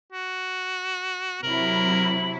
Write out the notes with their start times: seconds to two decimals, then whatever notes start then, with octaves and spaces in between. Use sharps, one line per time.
0.12 F#4
1.43 C3 F#3 E4 A#4 F#7